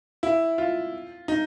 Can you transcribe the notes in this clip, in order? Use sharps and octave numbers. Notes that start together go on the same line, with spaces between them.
E4
F4
D#4